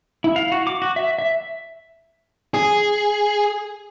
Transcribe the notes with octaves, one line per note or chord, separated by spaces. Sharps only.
E4
F5
F#4
D6
F#4
E5
E5
G#4